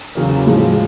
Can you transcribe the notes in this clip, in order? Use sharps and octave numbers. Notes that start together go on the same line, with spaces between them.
E2 C#3 F#3 A#3
A2 F3 G#3